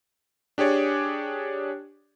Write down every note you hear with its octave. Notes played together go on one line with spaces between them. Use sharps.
D4 G4 G#4 C#5 D5